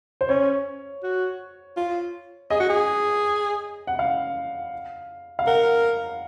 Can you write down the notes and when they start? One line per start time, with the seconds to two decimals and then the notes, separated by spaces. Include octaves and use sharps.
0.21 C5
0.29 C#4 C#5
1.03 F#4
1.77 F4
2.50 G#4 D#5
2.60 F#4
2.69 G#4
3.87 F#5
3.99 F5
5.39 F5
5.47 A#4 F#5